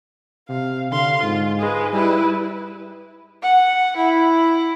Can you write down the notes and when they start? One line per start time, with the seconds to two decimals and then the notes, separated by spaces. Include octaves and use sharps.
0.49 C3 F5
0.92 D3 F5 C6
1.23 G#2 F4
1.59 G#3 B4
1.93 G3 E4 B4
3.42 F#5
3.96 E4